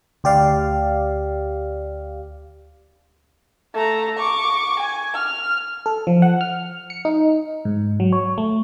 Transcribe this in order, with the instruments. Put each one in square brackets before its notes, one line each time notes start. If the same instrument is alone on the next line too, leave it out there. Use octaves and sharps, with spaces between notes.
[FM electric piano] D2 G4 D5 F5
[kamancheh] A3 A#5
C#6 D6
G#5
F6
[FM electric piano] A4
F3
F#5
F6
C#7
D#4
G#2
F#3
C#5
A3